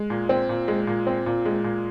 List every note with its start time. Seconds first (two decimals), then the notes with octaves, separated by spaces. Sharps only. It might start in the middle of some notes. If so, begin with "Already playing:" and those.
Already playing: G#3
0.10 A#2
0.29 C4
0.49 A#2
0.68 G#3
0.87 A#2
1.07 C4
1.26 A#2
1.46 G#3
1.64 A#2